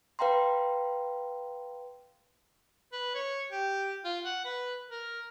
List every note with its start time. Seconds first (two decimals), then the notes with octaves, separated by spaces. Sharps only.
0.19 B4 F5 G5 A#5 C6
2.93 B4
3.15 C#5
3.52 G4
4.05 F4
4.25 F#5
4.45 B4
4.90 A#4